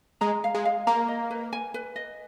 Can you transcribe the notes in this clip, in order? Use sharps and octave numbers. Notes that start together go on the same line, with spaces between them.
G#3 A#5
F5
G#3
F5
A#3 A#5
D#5
B4
G#5
B4
D#5